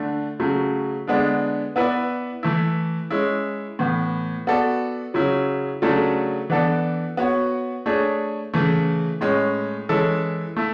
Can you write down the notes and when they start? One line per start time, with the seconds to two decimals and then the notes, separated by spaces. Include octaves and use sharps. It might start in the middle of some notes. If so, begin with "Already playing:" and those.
Already playing: D3 A3 D4
0.40 C#3 F#3 A3
1.07 D3 G#3 B3 D4
1.76 B3 E4 B4 D5
2.43 E3 A3 E4
3.10 G#3 C#4 E4
3.79 A2 E3 B3
4.47 B3 F#4 A4 D5
5.14 C#3 F#3 C#4 E4
5.82 C#3 F#3 A3 D4 A4
6.50 E3 B3 D4 A4 D5
7.17 B3 F#4 C#5
7.86 A3 D4 G#4 C#5
8.54 C#3 E3 A3
9.21 A2 G#3 C#4
9.89 E3 G#3 C#4 E4 A4
10.57 A3 E4